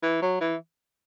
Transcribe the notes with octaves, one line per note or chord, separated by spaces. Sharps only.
E3
F#3
E3